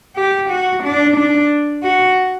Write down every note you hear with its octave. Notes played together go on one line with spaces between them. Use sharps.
G4
F#4
D4
D4
F#4